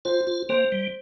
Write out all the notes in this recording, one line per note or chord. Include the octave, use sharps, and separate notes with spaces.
F4 C5
F4
A#3 C5
G3